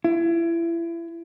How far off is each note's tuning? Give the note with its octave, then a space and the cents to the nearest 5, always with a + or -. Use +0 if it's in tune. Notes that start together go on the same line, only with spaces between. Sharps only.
E4 +30